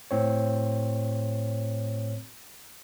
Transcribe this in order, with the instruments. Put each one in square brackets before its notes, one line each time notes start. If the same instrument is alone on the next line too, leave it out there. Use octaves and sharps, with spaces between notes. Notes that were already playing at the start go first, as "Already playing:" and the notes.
[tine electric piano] A2 C4 C#5